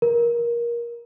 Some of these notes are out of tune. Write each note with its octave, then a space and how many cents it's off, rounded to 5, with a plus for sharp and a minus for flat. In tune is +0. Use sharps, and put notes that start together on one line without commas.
A#4 +20